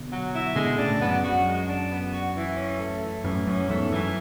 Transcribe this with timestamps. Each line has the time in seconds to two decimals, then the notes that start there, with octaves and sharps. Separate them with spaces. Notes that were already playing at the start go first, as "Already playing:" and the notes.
Already playing: B2 D3
0.11 F#3
0.34 E4
0.56 B2 D3 G#3
0.78 A2 C#3 D4
1.00 F#2 B3
1.23 F#2 F#4
1.46 G#3
1.68 D4
1.90 B3
2.13 F#4
2.36 E3
2.57 C#4
2.79 A3
3.02 E3
3.24 F#2 A2 E3
3.46 F#2 C#4
3.69 E2 G#2 A3
3.92 F#2 E3